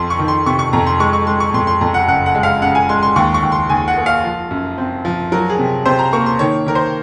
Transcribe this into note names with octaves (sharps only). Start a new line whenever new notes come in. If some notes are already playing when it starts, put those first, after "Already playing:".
Already playing: F2 F3 C6
C#6
D#3
C6
C3 C#6
C#6
F2 A#5
C6
G#3 C#6
C#6
G#3 C6
C#6
F2 C6
C6
F2 A#5
F#5
F#1 F#5
F#5
G#3
F5
C#3 F#5
G#5
G#3 C6
C6
D#2 C#6
C#6
D#2
C6
D#2 G#5
F#5
A#3
F5
F3
F#2
C4
F3
F#3 A#4
G#4
C3
C3 C5
A#5
A#3 C#6
C6
D#3 C#5
D#3 A#4
C5